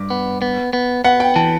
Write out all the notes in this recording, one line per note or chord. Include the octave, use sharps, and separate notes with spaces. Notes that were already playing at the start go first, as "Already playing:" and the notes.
Already playing: G2 D6
B3
B3
B3
B3 F#5
G5
E3 A5